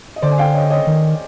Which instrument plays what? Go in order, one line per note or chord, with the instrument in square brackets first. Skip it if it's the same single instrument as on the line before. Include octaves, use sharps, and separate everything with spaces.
[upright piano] D#5
[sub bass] D3 [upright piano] C5 D5
[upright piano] G#5
F5 G5
C#5 D#5
C#5 D#5
[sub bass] D#3